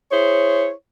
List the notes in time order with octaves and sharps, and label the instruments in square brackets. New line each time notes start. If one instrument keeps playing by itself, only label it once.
[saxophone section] E4 G#4 C5 C#5